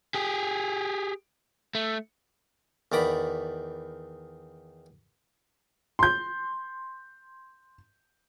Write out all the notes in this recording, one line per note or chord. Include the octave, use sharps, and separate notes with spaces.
G4 G#4
A3
E2 D#3 D5 A#5 B5
C6 G6